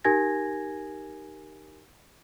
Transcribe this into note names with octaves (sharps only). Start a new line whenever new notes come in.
D#4 G4 A#4 G#5 G#6 A#6